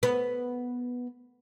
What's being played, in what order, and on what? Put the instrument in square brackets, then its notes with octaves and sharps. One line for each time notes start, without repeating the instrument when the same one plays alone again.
[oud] B3